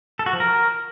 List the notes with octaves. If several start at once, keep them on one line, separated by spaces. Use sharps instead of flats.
A4
F#4
F3
A#4